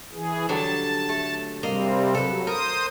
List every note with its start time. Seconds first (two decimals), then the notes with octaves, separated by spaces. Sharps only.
0.13 E3 G#4
0.49 D3 F#3 G3 A5
1.09 A3
1.63 C3 G3 A#3 C4 D#5 F5
2.15 F#3 A4 B4
2.47 A#4 C5 D#6